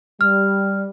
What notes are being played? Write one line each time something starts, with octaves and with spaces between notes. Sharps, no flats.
G3 F6